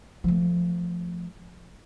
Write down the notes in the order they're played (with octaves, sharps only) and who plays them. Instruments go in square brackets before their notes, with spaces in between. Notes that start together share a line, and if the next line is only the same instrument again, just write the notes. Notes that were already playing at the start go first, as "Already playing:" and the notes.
[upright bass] F3 A3